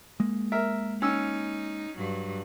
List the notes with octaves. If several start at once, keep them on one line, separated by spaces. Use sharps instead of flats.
G#3 A#3
A#4 E5
C#4 D#4 E6
G2 F#3